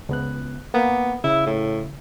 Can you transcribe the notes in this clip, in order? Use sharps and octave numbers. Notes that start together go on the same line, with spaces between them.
C#2 B3 F#6
A#3 B3
C#3 E4
A2